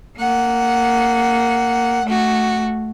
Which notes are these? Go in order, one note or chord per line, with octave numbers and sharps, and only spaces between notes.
A#3 F#5
A3 F#4